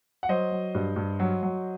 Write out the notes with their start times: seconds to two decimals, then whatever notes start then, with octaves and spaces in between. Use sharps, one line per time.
0.23 F#5
0.29 F#3 C5 D#5
0.52 F#3
0.75 G2
0.96 G2
1.20 F#3
1.43 F#3